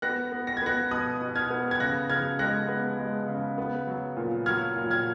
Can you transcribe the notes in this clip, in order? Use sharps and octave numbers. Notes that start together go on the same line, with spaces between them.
B3 F#6 A#6
B3
A#6
G#6
B3 F#6 A#6
B2 D#6 F#6
B2
F6 G#6
B3
G#6
C#3 F#6 A#6
C#3 F6 G#6
G#3 F#6 A#6
B3
G#3
C#3
B3
F#3
A#2
F#3 F6 G#6
A#2
F6 G#6